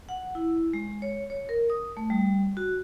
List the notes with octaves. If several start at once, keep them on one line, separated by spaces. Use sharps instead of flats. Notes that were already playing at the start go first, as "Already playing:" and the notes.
F#5
E4
G#3
C#5
C#5
A#4
D#6
A3
G3
F#4